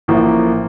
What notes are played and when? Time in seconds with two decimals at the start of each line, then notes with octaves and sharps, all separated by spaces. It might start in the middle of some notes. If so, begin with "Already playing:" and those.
0.08 A1 A2 F3 A#3